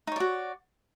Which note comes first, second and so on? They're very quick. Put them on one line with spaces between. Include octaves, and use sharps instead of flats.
D#4 C#5 D5 F#4